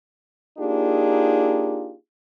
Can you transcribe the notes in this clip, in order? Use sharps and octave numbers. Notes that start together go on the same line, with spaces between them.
A#3 D4 D#4 F4 G4 G#4